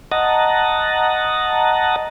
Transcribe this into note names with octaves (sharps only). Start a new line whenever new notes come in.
D#5 F#5 A5 A#5